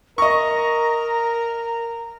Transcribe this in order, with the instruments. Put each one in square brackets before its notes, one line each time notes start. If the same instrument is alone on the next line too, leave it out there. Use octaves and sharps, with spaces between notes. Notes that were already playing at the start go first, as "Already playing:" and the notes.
[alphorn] A#4 [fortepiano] D#5 C#6 [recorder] A#5